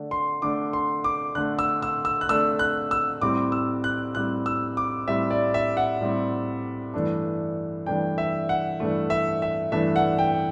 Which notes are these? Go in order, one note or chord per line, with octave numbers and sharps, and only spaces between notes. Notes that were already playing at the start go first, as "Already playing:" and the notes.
Already playing: D3 A3 D4
C6
D3 A3 D4 D6
C6
D6
D3 A3 D4 F#6
E6
E6
E6
F#6
D3 A3 D4 E6
F#6
E6
A2 G3 C4 D6
E6
F#6
A2 G3 C4 F#6
E6
D6
A2 G3 C4 E5
D5
E5
F#5
A2 G3 C4
G2 E3 A3 D4
G2 E3 A3 D4 G5
E5
F#5
G2 E3 A3 D4
E5
E5
G2 E3 A3 D4 E5
F#5
G5